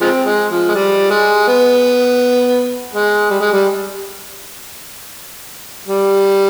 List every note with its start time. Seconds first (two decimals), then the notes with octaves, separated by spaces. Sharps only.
0.01 F3 G#3 C4
0.25 G#3
0.50 F3
0.69 G#3
0.74 G3
1.10 G#3
1.48 B3
2.93 G#3
3.30 G3
3.41 G#3
3.53 G3
5.86 G3